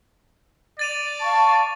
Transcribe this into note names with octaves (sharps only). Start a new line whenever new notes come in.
D5 A6 D#7 F7
F5 A5 C#6